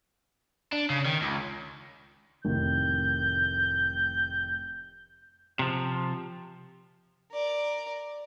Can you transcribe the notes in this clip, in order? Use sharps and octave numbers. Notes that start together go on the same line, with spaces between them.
D4
C#3
D#3
C#2
F1 A2 D#3 G6
C3 F3
A#4 D5